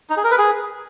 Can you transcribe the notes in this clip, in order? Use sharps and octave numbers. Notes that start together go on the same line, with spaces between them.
D#4
G#4
A#4
B4
G#4